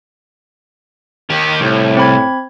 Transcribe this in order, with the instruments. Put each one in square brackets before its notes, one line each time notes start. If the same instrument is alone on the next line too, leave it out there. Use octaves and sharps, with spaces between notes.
[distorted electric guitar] D#3 G4
[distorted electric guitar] C2 [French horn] A2
[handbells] C4 B5 G#6